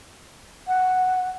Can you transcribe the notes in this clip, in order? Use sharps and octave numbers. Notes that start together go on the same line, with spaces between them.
F#5